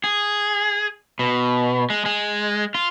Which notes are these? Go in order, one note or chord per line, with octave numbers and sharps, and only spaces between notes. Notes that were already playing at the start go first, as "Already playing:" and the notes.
G#4
B2
G#3
G#3
F4